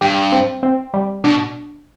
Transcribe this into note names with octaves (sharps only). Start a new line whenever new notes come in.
G2 G4
C4
C4
G3
B2 D4